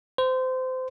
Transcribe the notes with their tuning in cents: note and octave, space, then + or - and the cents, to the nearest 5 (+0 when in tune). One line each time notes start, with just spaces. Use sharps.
C5 -25